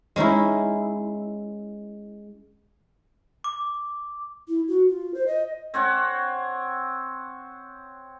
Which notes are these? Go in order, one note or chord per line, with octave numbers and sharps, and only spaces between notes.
G#3 C#4 D#4 E4
D6
E4
F#4
F4
C5
D#5
C4 C#5 F#5